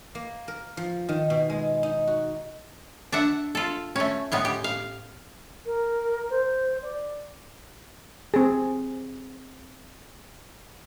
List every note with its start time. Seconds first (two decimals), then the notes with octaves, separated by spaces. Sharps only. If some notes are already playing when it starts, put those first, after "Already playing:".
0.15 A#3
0.48 A#4
0.77 F3
1.09 D#3
1.30 B2
1.50 G#3
1.83 D#4
2.07 F#4
3.12 D4 E5 F#5
3.55 F4 A4
3.96 A3 C#4
4.32 A2 G#3 B3
4.45 G4
4.64 F5
5.65 A#4
6.29 C5
6.81 D5
8.34 C4 G#4